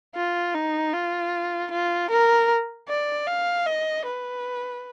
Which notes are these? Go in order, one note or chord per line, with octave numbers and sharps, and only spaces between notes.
F4
D#4
F4
F4
A#4
D5
F5
D#5
B4